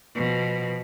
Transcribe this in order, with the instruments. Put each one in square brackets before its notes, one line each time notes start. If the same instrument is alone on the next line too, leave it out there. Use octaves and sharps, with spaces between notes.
[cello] B2 F3